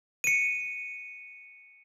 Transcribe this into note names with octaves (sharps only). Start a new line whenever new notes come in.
C#7 D#7